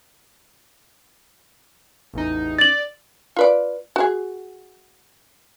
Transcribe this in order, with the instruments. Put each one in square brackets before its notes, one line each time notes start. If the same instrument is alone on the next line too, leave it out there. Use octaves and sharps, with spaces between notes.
[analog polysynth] A1 E2 D#4
[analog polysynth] D5 [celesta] A6 F#7
[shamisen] F4 B4 D5
F#4 G#4